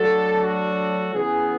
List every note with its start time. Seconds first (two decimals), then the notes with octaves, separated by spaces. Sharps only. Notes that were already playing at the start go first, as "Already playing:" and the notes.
Already playing: F#3 A3 D4 F#4 A4
0.40 F#4
1.14 C#3 E3 B3 G#4